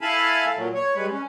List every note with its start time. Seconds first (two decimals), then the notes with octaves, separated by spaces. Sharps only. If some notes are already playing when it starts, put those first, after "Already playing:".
0.01 E4 A4 F5 G#5 A5 B5
0.56 A#2 F#3
0.75 C#5
0.95 G3 G#3 B4
1.11 C#4